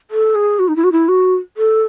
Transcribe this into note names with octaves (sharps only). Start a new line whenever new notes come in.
A4
G#4
F#4
D#4
E4
F#4
E4
F#4
A4